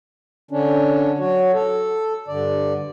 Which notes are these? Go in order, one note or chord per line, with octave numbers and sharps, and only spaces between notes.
D3 C#4 D4
F#3 F#4 C#5
A4
G2 D3 D5